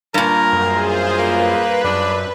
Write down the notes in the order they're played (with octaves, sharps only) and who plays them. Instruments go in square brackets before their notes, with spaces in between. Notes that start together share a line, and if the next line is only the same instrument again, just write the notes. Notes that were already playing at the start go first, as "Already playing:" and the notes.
[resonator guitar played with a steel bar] G2 A#2 [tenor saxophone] A#4
[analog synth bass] F#2 [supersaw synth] F4 G#4 C5
[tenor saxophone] A#3 [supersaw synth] B4
[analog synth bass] F#2 [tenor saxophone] D4